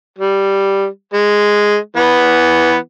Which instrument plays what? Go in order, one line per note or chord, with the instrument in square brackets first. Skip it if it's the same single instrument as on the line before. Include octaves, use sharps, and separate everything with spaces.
[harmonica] G3
G#3
E3 B3